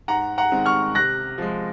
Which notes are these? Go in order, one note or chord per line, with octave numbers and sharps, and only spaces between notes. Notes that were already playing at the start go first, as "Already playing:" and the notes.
G#2 F#5 A#5
F#5 A#5
D#3 G#3 C4
C#6 F6
C3 F#6 A#6
F3 G#3